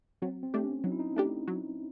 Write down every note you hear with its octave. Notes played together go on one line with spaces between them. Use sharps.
F#3 C4
C4
A3 D4 G4
C#4
F#3 D#4
E4
D#4
A3 D4 G4
F#3